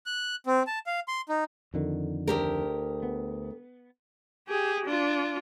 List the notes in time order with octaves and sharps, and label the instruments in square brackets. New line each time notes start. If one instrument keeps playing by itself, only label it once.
[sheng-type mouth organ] F#6
C4
A5
F5
C6
D#4
[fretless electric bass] F2 D3 D#3
[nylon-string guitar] D2 G4 A#4
[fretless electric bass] B3
[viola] G4 G#4
D4 F4